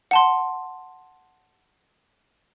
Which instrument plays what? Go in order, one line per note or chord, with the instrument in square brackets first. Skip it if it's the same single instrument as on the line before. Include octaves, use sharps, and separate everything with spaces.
[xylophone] F#5 A5 C6